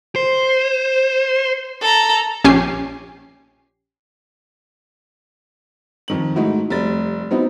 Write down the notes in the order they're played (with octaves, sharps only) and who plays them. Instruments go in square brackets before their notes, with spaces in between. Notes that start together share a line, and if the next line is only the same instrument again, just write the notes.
[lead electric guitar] C5
[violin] A4 A#5
[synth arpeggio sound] A#1 C#4 G4 G#5 C7
[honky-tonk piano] F2 D#3 F#7
G#2 A3 D#4 E4 F#4
F1 C3 G3 A6
F#3 B3 C4 D#4 E4